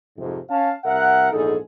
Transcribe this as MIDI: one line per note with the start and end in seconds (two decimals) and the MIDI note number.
0.18 0.38 41
0.18 0.38 44
0.18 0.38 48
0.50 0.72 61
0.50 0.72 77
0.50 0.72 81
0.84 1.28 36
0.84 1.28 70
0.84 1.28 76
0.84 1.28 78
1.32 1.56 34
1.32 1.56 40
1.32 1.56 44
1.32 1.56 63
1.32 1.56 68
1.32 1.56 69